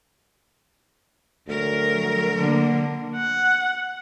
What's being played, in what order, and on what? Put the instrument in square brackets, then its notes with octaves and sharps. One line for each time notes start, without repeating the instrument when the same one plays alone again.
[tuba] D2 [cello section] F#3 A#4
[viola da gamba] D3 A#3
[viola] F#5